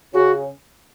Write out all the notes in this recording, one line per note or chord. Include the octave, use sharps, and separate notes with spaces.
C#3 F#4